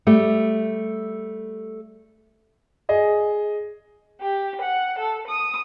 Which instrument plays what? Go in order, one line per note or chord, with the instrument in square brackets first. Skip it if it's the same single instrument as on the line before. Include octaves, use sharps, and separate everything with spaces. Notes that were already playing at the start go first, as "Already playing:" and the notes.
[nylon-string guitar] G3 A3 G4
[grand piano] G#4 D#5
[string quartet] G4
F#5
A4
D#6